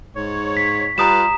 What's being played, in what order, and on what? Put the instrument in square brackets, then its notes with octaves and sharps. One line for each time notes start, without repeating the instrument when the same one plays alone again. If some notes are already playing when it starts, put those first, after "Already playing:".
[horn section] G#2 C#5
[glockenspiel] B6
[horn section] G3 F4 B4 [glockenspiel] A#5 D#6 E7